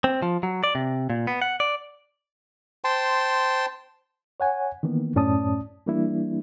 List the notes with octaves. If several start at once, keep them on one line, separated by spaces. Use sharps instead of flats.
C4
F3
F#3
D5
C3
A#2
B3
F#5
D5
C5 G5 A5 C6
C#5 F#5 G#5
D#3 E3 A#3 B3
F#2 A2 C#4 D5 A5 D#6
E3 G3 A#3 D4 E4